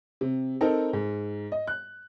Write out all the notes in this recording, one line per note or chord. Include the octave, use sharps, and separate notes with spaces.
C3
C4 D#4 A4 A#4
G#2
D#5
F#6